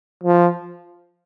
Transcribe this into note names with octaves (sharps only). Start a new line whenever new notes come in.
F3